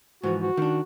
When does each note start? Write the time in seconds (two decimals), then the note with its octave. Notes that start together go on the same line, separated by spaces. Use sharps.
0.23 G#2 E3 F3 F#4
0.42 F#4
0.57 D#3 D4